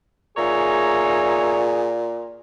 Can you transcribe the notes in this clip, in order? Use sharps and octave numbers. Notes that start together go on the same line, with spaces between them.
A#2 D#4 G#4 C#5 E5